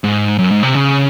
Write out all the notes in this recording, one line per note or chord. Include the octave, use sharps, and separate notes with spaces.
G#2
F#2
G#2
C3
C#3